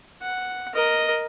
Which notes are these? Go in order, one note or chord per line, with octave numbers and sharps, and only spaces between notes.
F#5
A#4 D#5